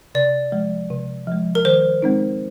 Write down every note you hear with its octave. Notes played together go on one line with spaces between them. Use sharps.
C3 D5
F3 G#3
C3
F3 G#3
A#4
D#3 C5
G#3 C4 D#4